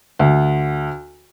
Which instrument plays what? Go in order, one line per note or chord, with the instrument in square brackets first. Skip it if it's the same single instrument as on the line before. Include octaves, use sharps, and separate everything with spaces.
[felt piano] D2